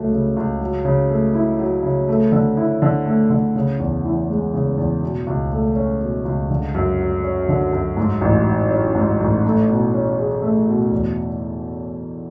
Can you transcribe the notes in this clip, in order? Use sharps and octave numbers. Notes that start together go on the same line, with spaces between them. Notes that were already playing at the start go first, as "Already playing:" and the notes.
Already playing: C#2 F#3 A3
C#3
C#2
F#3
C#3
A3
E4
F#3
C#3
A3
D3
E4
D3
A3
D3
C#3
E2
E3
G#3
C#3
E2
B2
C#2
A3
C#4
B2
C#2
D3
F#2
F#3
C#4
D3
F#2
G#2
A1
F#3
C#4
G#2
A1
A3
B2
C#4
G#4
A3
B2
E2